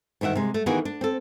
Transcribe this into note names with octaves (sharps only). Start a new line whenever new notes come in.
D2 G2 D#3 E5 F#5
C3 G#3
A3
D#3 E3 A#3 B3 F#4 G#4
D4
C4 A4